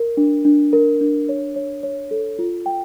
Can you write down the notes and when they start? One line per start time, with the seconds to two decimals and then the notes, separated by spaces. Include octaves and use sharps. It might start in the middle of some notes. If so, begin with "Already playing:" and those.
Already playing: A#4
0.17 D4
0.45 D4
0.73 A#4
1.01 D4
1.29 C#5
1.56 C#5
1.83 C#5
2.11 A4
2.39 F4
2.66 G5